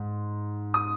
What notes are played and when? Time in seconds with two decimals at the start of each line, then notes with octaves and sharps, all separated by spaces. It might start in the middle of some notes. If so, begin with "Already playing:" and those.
Already playing: G#2
0.74 D#6